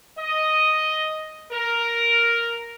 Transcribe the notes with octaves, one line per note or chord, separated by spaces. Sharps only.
D#5
A#4